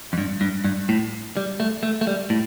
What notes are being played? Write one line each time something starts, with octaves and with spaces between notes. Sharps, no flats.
F2
G2
G2
G2
A2
G3
A3
A3
A3
G3
A2